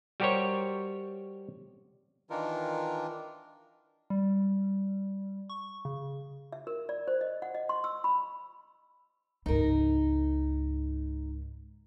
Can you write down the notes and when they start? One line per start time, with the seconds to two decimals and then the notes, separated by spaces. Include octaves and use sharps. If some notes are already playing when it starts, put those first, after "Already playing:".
0.20 G3 F#4 G4 A#4 C5 C#5
2.30 D#3 E3 D4 D#4 F4 A#4
4.10 G3
5.50 C#6
5.85 C#3
6.52 E5
6.67 A#4
6.89 D5
7.07 C5
7.21 D#5
7.42 F#5
7.55 D#5
7.69 C6
7.84 E6
8.04 B5
9.46 C#2 G#2 D#4 A#4